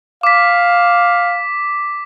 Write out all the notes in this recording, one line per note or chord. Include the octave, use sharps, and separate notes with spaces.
F5 D6 B6